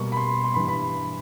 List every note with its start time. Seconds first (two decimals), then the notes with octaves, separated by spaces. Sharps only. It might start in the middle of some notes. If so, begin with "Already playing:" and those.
Already playing: B2 G3 A#3 C#6
0.12 B5
0.17 C6
0.44 C6
0.54 G2 E3 G3 B5
0.68 B5